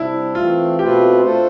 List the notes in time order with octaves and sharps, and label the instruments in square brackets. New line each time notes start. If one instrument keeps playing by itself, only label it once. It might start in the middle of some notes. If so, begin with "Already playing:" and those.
Already playing: [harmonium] C3 G3 D4 [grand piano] E4
[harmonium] E3 A3 C4 [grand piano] F4
[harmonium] B2 A3 C4 F4 B4 [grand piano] G4
[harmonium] A3 D4 F4 A4 C5